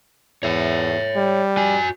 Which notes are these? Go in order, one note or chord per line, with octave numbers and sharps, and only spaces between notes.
E2 C#5 E5
G3
F#4 G#5